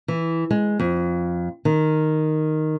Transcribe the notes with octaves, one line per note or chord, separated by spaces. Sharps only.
E3
G#3
F2
D#3